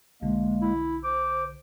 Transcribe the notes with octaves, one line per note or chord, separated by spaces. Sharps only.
B1 D3 G#3 A#3
E4
C5 D6